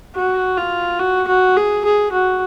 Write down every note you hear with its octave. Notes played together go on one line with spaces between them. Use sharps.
F#4
F4
F#4
F#4
G#4
G#4
F#4